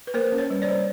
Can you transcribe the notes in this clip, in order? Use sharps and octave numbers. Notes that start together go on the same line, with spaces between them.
B4
A#3 A#4 C5
C#4
B4 C#5
G3
C5 D5
G3